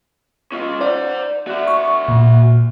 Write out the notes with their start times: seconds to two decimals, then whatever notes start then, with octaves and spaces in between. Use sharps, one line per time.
0.52 C#4 F4
0.81 C5 D5 F#5
1.47 F#4 E5
1.68 C#6
2.08 A#2